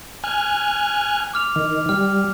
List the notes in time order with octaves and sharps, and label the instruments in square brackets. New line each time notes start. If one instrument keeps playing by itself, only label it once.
[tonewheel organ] G#5 F6 F#6
[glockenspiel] D6 F6 F7
[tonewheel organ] D#3
[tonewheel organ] G3 [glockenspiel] F6